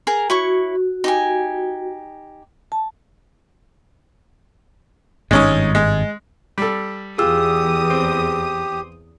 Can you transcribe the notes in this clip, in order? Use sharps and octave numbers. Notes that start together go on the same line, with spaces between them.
G#4 A#4 A#5
E4 F#4 C#5 C#6
D#4 G4 G#5
A5
G#1 G2 G#3 C#4 D#4
G#3
G3 A4
E2 F4 G4 G#4 D#6 E6
C4